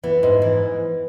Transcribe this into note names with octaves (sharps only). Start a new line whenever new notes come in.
E3 B3
G#2
E3